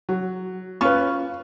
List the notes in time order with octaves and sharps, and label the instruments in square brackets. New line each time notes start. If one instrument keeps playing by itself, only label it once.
[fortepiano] F#3
[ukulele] C#4 F4 [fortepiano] B4 C#6